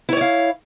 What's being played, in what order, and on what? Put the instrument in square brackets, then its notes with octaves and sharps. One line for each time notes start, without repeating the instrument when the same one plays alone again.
[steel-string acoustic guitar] E4
C#5
D5
F5